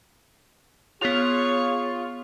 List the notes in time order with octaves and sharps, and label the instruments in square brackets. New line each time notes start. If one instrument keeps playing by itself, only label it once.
[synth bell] B3 F7 [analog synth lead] F4 [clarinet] G#4 [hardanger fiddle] C#5